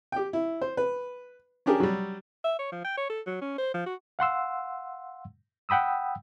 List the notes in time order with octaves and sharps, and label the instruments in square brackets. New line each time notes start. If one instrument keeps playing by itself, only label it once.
[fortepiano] G4 G5
E4
C5
B4
C#4 D4 G4 G#4 A#4
F#3 G3
[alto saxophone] E5
C#5
F3
G5
C#5
A4
F#3
C#4
C5
F3
F#4
[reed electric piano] F5 F#5 C6 E6
F#5 G5 B5 D#6 E6